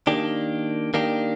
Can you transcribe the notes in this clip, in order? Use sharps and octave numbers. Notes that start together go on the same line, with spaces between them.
D#3 A#3 D4 G4
D#3 A#3 D4 G4